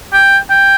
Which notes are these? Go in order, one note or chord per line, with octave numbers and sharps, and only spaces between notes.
G5
G5